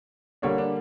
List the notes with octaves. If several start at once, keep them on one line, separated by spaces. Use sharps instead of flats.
D3 G3 A#3 D4 C#5
D4